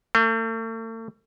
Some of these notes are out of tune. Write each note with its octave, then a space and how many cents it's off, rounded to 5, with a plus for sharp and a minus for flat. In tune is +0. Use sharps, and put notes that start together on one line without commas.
A3 +40